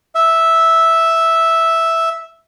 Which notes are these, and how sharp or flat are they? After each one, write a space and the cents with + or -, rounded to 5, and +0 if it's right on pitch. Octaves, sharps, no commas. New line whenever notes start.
E5 -5